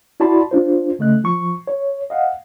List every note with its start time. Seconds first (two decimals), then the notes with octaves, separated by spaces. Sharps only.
0.20 E4 F#4 D5 A5 B5 C6
0.51 D4 F4 C5
0.99 C#3 A3 D#5 F#6
1.24 F3 C#6
1.67 C#5
2.10 D#5 F5 F#5